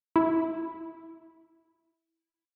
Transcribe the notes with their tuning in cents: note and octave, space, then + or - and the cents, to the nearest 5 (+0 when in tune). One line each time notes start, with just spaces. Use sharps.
E4 -5